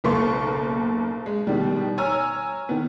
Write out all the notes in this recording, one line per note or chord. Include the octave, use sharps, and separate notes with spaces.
F#1 B1 A#3 A4 C6 C#6
G#3
B2 D#3 G3
C#5 G#5 A#5 E6 F6
D#3 B3